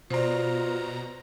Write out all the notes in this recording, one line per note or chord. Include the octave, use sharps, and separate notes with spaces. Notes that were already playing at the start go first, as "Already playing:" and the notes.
B2 F4 C5 D5 A#5